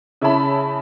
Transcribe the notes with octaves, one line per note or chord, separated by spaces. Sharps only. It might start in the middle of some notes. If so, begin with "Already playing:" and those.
C#3 E4 C#5 E5 A5 B5